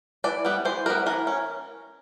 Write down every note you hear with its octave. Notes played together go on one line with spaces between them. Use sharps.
E3 D5
G3 B3
E3 C5
G3 B3 A#4
E3 A#4
C#4